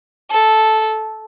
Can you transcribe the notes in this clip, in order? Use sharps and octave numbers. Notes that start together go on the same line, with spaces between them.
A4